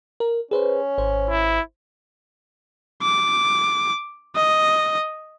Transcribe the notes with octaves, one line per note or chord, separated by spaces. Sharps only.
A#4
C#4 G#4 B4 C5
G#1 C5
E4
D6
D#5